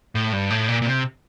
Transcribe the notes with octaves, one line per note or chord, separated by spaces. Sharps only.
A2
G2
A2
A#2
A#2
C3